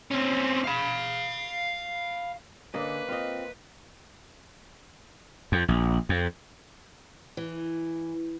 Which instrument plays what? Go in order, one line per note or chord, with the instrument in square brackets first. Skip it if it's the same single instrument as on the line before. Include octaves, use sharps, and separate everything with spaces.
[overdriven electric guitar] C4 C#4
F5 B5
[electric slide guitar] D3 C#4 [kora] A#3 D5 D#5 [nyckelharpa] B4
[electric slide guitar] C4 F4 [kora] D#5 F5
[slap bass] F2
A#1
F2
[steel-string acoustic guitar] E3